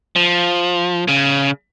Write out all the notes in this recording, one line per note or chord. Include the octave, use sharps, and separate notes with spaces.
F3
C#3